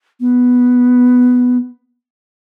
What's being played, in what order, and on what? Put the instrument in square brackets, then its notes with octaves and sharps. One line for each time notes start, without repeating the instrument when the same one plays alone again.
[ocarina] B3